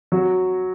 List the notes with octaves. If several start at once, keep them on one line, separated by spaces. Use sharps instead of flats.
F#3 F#4